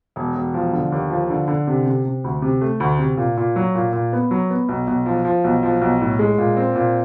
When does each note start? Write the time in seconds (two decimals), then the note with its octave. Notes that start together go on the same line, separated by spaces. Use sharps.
0.16 E1
0.36 E1
0.54 F3
0.73 D3
0.92 D#2
1.10 F3
1.30 D3
1.48 D3
1.67 C3
1.86 C3
2.05 C3
2.24 D2
2.42 C3
2.61 A3
2.80 D2
2.98 C3
3.17 A#2
3.37 A#2
3.56 F#3
3.75 A#2
3.93 A#2
4.13 B3
4.31 F#3
4.50 B3
4.69 B1
4.87 B1
5.06 F3
5.25 F3
5.44 B1
5.63 F3
5.82 B1
6.01 A2
6.19 G#3
6.38 A#2
6.57 C4
6.76 A#2